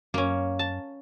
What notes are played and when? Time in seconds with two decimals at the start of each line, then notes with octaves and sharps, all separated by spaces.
0.14 F#2 A#3 C#4
0.59 A5